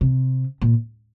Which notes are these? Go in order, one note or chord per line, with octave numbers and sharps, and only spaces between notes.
C3
A#2